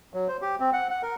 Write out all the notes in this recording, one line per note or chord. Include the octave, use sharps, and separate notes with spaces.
F#3
C5
G4
C4
F#5
F#5
A#4